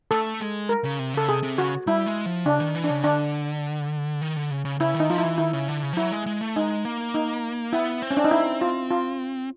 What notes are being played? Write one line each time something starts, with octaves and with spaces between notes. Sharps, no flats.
A3 A4
G#3
A#4
C#3
C3
C#3 A4
C3 G#4
C3
C#3 F#4
G3 E4
G#3
F3
C#3 D4
D#3
E3
D4
C#3
D3 D4
D#3
D3
C#3
C#3
C#3 E4
D#3
D#4
F3 F4
E4
E3
D#3 E4
C#3
D3
C#3
F3
F#3 E4
G#3
G#3
A3
G#3 D#4
A#3
D#4
B3 E4
C4
C#4
D4
D#4
E4
F4
F4